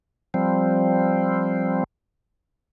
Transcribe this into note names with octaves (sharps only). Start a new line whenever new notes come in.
F3 G3 C4